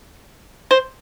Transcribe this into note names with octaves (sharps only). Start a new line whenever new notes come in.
C5